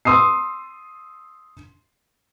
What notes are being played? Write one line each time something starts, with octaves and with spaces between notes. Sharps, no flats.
C6 D#6 E6 C7